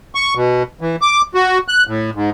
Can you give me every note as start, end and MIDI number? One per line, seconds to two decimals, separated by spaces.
0.15 0.34 85
0.35 0.63 47
0.81 0.96 52
1.02 1.22 86
1.34 1.58 66
1.68 1.84 90
1.87 2.10 45
2.15 2.30 44